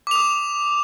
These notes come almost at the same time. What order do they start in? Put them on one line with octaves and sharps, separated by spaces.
D6 F7 D#6